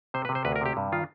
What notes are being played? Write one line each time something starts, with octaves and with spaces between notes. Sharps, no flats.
C3 C5
B4
C3
C5
D2 B4
A#4
C3 G4
G2
D#3 F4